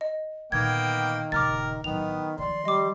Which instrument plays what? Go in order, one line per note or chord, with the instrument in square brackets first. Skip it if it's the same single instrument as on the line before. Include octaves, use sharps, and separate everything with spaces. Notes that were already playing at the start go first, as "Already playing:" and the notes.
[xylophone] D#5
[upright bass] A#2 D3 [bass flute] D#3 [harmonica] A#3 B3 G5 [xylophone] G#6
[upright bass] D#1 C#3 [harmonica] A#4 [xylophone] D6 F6 A6
[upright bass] A1 F#3 [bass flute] D#3 [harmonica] B3 [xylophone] F7
[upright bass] D#3 F3 [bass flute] D5 [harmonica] C6
[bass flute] G3 [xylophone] D#5 D6